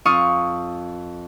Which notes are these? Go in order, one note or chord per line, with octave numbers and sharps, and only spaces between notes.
F2 F4 F5 C#6 D#6